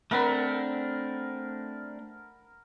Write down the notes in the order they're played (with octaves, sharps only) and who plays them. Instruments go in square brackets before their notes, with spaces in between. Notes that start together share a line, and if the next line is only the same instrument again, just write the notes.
[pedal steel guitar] A3 C4 D4 [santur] A#4 F#5 B5